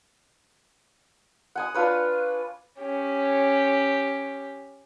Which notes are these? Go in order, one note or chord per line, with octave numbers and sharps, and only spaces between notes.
F#5 G#5 D#6
D4 F4 B4 C#5
C#4 G4